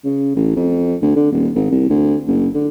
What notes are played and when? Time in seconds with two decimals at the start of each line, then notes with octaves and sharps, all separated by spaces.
0.04 C#3
0.36 A1
0.56 F2
1.02 D2
1.16 D3
1.32 D#1
1.55 G#1
1.71 C2
1.90 D2
2.28 F#1
2.54 D3